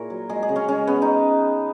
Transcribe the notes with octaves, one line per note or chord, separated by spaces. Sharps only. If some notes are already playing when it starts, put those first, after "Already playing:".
Already playing: A#2 E4 G#4 A#4 C#5
F#3
G#3 G#4
G#4
C#3
C#4
G#3 C#4
C#3 B3
D#4